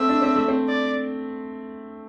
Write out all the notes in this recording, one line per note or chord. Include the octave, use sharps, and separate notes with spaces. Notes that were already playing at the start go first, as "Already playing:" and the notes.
Already playing: A3 C4 E5
D4
C4
A3
C4
D5